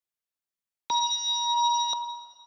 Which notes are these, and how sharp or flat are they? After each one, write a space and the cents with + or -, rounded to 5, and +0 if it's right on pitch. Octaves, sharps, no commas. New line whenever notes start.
A#5 +35